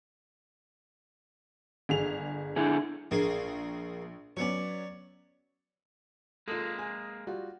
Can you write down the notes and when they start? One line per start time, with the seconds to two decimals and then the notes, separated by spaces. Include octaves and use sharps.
1.89 G1 G#4 F7
2.56 D3 E4 G#4
3.11 A#1 A#3 G#4
4.37 F#3 B3 C#4 C#5 D5
6.48 G#3 A#3 F4 A4
6.79 G#5
7.27 G3 F4 F#4